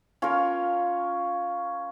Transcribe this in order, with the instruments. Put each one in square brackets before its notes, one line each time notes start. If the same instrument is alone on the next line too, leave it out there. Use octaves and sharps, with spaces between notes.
[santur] C#4 F4 A#4 C#5